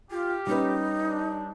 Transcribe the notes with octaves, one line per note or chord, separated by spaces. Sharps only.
F4 G4
G3 C#4 D#4 B4
D4